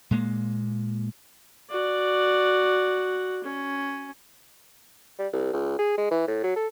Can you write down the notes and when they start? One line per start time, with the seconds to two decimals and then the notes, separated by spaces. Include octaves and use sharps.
0.11 A#2 G#3 A#3
1.70 F#4 D5
3.44 C#4
5.19 G3
5.33 C2
5.53 C#2
5.79 G#4
5.98 G#3
6.11 E3
6.28 A2
6.43 F#3
6.56 A4